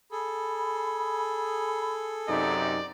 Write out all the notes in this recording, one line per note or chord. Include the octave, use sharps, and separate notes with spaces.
G#4 A4 B5
F#2 C3 D#4 D5